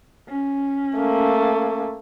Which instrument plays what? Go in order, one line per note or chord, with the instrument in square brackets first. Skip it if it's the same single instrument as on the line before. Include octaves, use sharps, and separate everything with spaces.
[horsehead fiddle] C#4
[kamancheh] A3 A#3